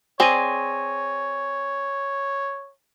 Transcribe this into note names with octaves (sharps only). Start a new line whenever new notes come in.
C4 G#4 C#5 D5 G#5 A#6 D#7